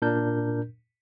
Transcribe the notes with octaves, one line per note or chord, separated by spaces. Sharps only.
A#2 D4 A#4 G6